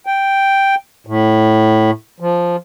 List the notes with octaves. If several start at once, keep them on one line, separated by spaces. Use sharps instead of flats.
G5
A2
F3